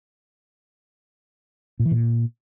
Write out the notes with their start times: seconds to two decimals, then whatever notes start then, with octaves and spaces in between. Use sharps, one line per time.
1.80 A#2
1.85 E3
1.91 A#2